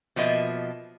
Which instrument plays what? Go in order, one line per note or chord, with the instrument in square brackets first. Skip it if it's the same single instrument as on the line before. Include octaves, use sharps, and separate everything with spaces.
[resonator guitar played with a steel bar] B2 F3 A#3 D#5 E5